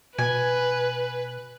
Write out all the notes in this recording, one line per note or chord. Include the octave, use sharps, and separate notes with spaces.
B2 B4 G#5